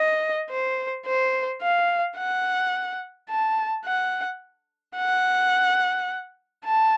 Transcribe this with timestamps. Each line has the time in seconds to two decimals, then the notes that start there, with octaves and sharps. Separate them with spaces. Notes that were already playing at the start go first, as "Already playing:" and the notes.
Already playing: D#5
0.50 C5
1.06 C5
1.62 F5
2.17 F#5
3.29 A5
3.85 F#5
4.97 F#5
6.65 A5